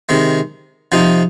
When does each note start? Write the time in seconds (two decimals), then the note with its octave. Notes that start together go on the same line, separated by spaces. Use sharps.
0.09 C3 D#3 G#3
0.92 C3 F3 C4 D#4